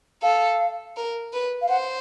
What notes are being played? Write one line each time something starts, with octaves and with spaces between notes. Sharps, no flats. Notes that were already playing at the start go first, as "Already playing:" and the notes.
A4 F5
A#4
B4
F5
C5 F#5